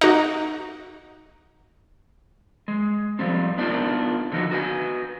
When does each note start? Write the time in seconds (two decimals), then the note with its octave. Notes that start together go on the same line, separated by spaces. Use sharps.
0.01 D#4 F#4
2.68 G#3
3.19 F3 G3 C4
3.58 B3 D4 D#4 F4 A#4
4.32 D3 F3 D#4 E4 F#4
4.51 F#4 B4 G#5